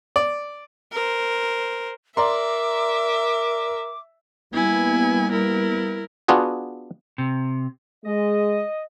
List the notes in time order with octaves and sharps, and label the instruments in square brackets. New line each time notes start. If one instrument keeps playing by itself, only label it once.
[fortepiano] D5
[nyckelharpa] A#4 C5
[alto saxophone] A#4 [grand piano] D5 A#5 C6 [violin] E5 [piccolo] D6
[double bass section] G3 A#3 B3 [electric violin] E4 G#5
[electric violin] E4 A#4
[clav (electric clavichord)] B3 D4 F4 F#4 G#4
[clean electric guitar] C3
[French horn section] G#3 [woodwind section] D#5